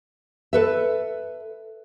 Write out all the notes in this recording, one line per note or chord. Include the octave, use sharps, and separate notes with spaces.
A4 B4 E5